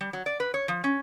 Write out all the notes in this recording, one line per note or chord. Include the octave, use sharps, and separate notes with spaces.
G3
F#3
D5
B4
C#5
F3
C#4